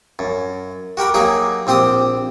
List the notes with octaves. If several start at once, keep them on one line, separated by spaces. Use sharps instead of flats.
F#2
F#4 G4 A#4 B5
F#3 A#3 D#4 G4 G#4
A#1 C4 G4 C6 D#6